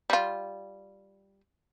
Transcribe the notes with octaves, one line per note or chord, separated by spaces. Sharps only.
G3 F4